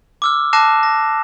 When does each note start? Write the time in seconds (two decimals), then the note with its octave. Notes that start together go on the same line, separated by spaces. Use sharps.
0.22 D6 E6 F6
0.53 A5 D6 F#6 A#6 C7 E7
0.83 A#6